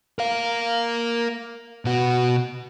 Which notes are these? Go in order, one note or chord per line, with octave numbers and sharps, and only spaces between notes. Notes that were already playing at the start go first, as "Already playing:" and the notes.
A#4 F5
B2 F#4